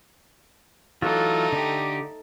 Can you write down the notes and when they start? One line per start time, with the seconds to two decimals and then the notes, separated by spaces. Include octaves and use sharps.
1.02 E3 F#3 A3 D#4 F4
1.52 D3 G4